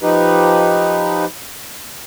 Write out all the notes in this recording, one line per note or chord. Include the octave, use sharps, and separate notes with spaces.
F3 D#4 G4 B4